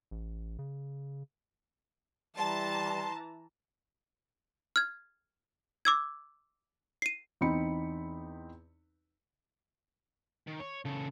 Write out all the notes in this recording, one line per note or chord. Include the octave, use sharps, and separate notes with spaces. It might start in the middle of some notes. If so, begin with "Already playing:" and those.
A1
C#3
E3 G3 A5 A#5 C6
F6 G#6
D6 E6 G#6
C7 D#7
E2 C4 D#4 B5 C#7
D#3
C#5
C#3 A4